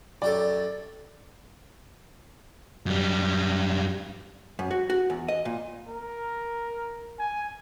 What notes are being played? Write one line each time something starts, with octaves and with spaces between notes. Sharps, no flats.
F#2 G4 A4 D5
F#2 G3
F#2
F#4
F#4
E2
D#5
A#2
A#4
G#5